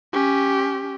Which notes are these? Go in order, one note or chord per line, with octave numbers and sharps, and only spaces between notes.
C#4 G4